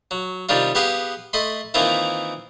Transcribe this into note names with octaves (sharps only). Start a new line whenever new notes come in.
F#3
C3 D#3 G3 D4 F4
B3 G4 G#4 B4 F5
A3 D#5 B5 C6
D#3 E3 A#3 C4 E4 F4